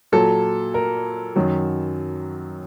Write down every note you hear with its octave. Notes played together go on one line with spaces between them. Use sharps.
A#2 F#3 A4
A#4
F#2 D#3 F#3